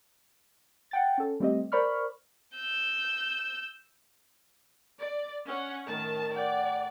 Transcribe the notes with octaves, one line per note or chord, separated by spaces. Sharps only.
F#5 G5 A6
C#4 A4
G3 A3 C4 G4 D#5
A#4 C5 D5 B5 C#6 F6
E6 G6
D5
C#4 F#5
A2 D#3 A#4 A5
D5 F#5 G5